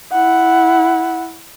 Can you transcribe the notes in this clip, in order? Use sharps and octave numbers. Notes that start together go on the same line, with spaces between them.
E4 F#5